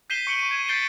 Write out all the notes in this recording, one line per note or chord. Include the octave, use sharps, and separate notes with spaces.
G6 B6 C7 D#7 E7 G7
C#6 C#7 D7 F#7 G7
C#6 D#7
G#6 E7
G6 A6 B6 C7 D7 G7